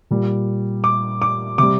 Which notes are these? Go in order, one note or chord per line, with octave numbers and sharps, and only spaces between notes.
A#2 G3
D6
D6
C3 G3 D6